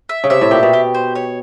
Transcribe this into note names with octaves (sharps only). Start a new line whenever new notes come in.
E5
C#3
C3 E5
A2
A#2 G4
B2
G4
C5
C#5